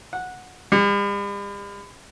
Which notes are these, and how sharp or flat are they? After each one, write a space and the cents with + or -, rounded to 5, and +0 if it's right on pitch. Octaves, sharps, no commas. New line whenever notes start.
F#5 -15
G3 +45